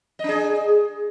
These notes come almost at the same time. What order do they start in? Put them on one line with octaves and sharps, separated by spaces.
D#5 D4 G#4